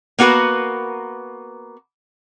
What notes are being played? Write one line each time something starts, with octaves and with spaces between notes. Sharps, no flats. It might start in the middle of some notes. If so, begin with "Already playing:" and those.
A#3 B3 F#4 A#4 B4